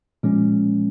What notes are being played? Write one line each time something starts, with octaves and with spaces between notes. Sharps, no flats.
A#2 F3 G#3 C#4